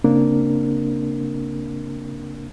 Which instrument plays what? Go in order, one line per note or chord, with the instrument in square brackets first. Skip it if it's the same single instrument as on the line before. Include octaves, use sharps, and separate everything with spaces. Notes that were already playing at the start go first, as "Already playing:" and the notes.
[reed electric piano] C#3 A#3 C4 D4 A#4